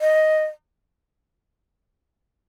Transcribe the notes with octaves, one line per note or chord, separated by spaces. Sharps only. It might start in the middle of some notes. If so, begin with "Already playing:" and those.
D#5